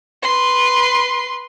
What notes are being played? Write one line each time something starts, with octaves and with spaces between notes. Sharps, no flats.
B4 C6